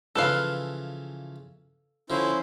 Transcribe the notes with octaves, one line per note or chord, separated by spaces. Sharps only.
C#3 E3 F3 A4 B4 F5
D3 F3 C#4 E4 C5